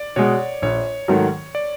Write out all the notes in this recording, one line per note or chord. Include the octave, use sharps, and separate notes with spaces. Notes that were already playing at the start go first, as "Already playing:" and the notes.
Already playing: D5
B2 G#3 C#5
A#1 C#5
G#2 D#3 F#3 A3
D5